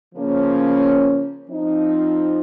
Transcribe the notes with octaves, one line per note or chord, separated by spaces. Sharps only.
C#3 F3 A#3 C#4
F3 C4 D#4